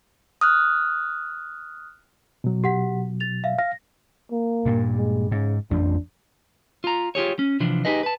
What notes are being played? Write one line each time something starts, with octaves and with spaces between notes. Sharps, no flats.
D#6 F6 F#6
B2 F#3
G4 F#5 B6
A6 F7
E5 F5
F5 A#6
A#3
G2 A#2
G#3
G#2 C#3
A1 F2 F3 D4
F4 A#5
F4 G4 G#4 C#5
C#4
C3 E3 F3 D4
D#4 G4 G#4 B4 D#5
B4 A5